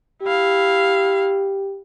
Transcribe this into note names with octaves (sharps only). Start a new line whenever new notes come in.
E4 G4 F5